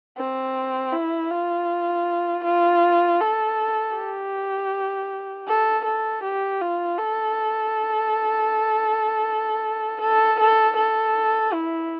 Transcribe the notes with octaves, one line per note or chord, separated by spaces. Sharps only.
C4
E4
F4
F4
A4
G4
A4
A4
G4
F4
A4
A4
A4
A4
E4